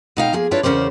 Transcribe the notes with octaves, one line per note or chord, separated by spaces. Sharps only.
B2 D#4 F5 G5
F3 A#3 G#4
D4 E4 F4 B4 C#5 D5
E2 C#3 C#4 A#4 C5 D5